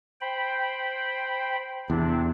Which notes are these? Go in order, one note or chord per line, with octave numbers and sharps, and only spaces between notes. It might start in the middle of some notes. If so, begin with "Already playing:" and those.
C5 G5 B5
E2 C3 D4